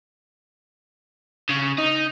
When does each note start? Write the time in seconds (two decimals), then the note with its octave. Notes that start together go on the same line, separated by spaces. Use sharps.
1.50 C#3
1.78 D#4